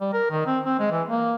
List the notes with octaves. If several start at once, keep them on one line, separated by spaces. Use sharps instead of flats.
G3
A#4
D#3
C4
C4
G#3
E3
A#3